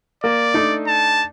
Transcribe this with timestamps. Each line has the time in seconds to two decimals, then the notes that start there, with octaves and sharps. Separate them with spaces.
0.24 A#3 D5
0.54 A3 D4 D#4
0.88 A5